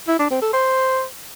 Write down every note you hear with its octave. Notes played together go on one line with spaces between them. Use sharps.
E4
D4
C4
A4
C5